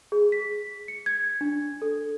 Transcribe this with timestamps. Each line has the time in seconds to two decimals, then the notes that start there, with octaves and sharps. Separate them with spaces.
0.12 G#4
0.32 B6
0.88 C#7
1.06 G#6
1.41 D4
1.82 A4